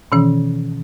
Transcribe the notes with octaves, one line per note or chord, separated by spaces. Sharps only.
B2 D#3 E3 C#4